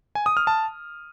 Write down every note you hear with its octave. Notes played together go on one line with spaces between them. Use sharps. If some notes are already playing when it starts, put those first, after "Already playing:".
G#5
D#6
F6
A5